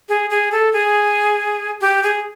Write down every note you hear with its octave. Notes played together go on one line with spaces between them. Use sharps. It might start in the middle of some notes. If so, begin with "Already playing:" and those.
G#4
G#4
A4
G#4
G4
G#4